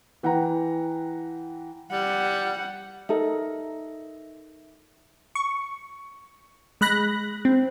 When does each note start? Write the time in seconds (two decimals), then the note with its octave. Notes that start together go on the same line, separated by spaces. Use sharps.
0.23 E3 F#5 G5 A#5
1.91 G3 F#5
3.09 D#4 A4 A#4 E5
5.35 C#6
6.81 G#3 B5 F#6 A#6
7.45 C4